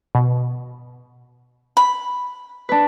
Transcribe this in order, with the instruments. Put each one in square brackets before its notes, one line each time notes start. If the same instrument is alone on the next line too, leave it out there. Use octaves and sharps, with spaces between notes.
[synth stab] B2
[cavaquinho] B5
[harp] D4 B4